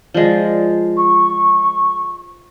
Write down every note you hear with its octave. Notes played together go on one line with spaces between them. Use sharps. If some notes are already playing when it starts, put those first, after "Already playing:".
F3 G#3 D5
C#6